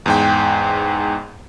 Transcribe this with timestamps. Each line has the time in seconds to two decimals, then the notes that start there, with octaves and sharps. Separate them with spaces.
0.06 E2 G#2 G5